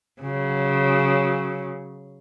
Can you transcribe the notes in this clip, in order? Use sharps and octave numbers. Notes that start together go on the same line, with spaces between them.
C#3 F#3